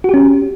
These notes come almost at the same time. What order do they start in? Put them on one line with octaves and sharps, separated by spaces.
F#4 G4 C#4